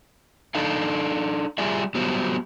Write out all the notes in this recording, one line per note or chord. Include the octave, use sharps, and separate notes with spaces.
D4 D#4 A4 D#5 F5
G3 F4 G4 G#4 D5 E5
F#3 G3 B3 F4 G4 C5